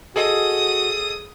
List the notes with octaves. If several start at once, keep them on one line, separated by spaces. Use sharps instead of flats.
F#4 G#4 A4 D#5 D#6